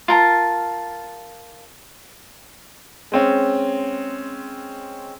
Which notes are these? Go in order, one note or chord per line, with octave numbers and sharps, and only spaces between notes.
F4 A#4 A5
G#3 C4 C#4